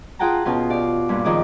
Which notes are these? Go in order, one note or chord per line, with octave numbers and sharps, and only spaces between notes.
F4 G#4 F#5 G5 A5 A#5
B2 C#4 F4
G4 D5 F5
G2 A#2
F2 D#3 C#4 G#4 D6